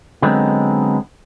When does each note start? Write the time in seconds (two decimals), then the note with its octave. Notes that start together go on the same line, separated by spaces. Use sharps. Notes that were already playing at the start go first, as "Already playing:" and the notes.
0.22 D3 F#3 G#3 B3 C4 D#4